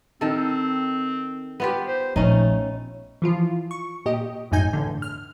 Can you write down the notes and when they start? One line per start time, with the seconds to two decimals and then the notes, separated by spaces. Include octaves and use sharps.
0.21 D#3 C4 A4
1.60 B3 F4 G4
1.87 C5
2.16 A#1 A3 C#4 D#4
3.22 E3 F3 F4
3.71 C#6
4.06 A#2 G4 D#5
4.51 G#1 F#2 A2 D#4 G#5 G6
4.73 E2 A2 D3
5.02 F6